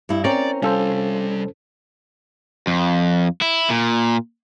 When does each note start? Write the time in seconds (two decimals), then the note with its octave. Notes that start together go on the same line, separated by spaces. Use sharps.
0.09 G2 E4
0.24 C4 C#4 A#4 D5
0.63 C2 G3 C#4 F4 A4 C5
2.67 F2
3.42 E4
3.70 A#2